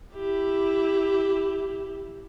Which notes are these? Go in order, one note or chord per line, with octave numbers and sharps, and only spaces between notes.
E4 G4